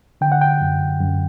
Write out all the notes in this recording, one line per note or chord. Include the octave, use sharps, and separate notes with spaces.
D3 G5
F#5
G5
F#2
F#2